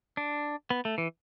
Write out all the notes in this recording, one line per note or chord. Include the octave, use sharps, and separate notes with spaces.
D4
B3
A3
E3